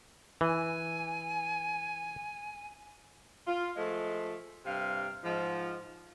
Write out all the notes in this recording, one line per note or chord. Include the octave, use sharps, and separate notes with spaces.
E3 G#5
F4
F3 G#3 A3 C5
G2 C3 F5
G#2 F3